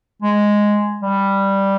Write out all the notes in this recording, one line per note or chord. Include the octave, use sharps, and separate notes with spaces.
G#3
G3